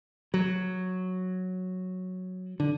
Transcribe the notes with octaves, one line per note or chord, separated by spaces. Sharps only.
F#3
D3